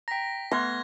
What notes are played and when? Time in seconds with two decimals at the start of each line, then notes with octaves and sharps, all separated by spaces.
0.08 G5 A#5 A#6 B6
0.51 A3 B3 C6 F6 F#6 G#6 A#6